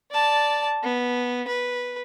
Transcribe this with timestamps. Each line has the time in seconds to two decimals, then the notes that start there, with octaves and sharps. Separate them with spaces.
0.11 D5 A5
0.83 B3
1.48 B4